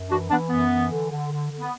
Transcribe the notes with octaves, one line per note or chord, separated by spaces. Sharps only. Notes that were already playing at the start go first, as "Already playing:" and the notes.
Already playing: F#2
E3 D4 F#4
E3 B3 D4
F#2 B3
E3
D3
D3
D3
D3
B3